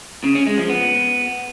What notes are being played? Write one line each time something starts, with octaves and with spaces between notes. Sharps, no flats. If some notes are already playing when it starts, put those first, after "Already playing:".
C#3
C#4
G#3
F3
B3